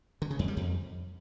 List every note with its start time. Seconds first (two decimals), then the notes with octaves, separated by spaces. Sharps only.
0.22 D3
0.30 C#3
0.39 F2
0.48 G3
0.57 F2